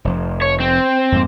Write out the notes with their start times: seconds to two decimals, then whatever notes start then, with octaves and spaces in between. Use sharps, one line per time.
0.05 F1 F2 F3
0.42 C#5
0.60 C4
1.12 F2 G#2 A#3